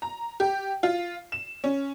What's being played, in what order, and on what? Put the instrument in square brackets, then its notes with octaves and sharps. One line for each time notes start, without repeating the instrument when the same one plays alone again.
[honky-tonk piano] A#5
G4
F4
E7
C#4